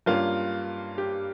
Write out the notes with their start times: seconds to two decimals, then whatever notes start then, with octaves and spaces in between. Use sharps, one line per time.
0.06 G2 G3 A#3 C#4 F4
0.98 G4